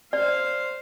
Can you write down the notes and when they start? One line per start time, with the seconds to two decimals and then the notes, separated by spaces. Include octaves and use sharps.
0.13 C5 D5 F5